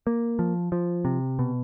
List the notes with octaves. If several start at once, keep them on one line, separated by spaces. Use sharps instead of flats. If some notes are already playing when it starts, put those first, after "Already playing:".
A#3
F3
F3
C3
B2